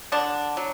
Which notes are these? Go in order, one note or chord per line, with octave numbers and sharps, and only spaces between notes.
D3 D4
F#3